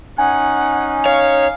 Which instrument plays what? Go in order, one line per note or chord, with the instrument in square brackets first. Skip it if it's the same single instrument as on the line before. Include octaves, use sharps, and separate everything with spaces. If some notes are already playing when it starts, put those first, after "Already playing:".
[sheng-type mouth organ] C#4 D#4 [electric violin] F#5 [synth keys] G#5
[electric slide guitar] C#5 [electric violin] F5